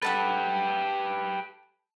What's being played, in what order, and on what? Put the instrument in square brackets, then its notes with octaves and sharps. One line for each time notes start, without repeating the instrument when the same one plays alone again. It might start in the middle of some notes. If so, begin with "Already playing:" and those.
[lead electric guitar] G4 B4 [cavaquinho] A4 F#5 B5